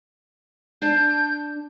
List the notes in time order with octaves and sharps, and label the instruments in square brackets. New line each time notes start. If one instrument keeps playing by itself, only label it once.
[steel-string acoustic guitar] D4 A5 [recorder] G6